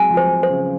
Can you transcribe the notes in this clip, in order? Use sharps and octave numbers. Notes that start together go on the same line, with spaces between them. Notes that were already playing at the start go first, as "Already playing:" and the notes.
Already playing: F#3 G#3 C4 G#5
F3
C5
C5
C#3